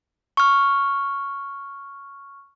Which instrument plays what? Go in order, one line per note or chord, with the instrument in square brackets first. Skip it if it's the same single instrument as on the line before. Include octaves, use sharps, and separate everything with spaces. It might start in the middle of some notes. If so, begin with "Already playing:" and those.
[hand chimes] C#6 F6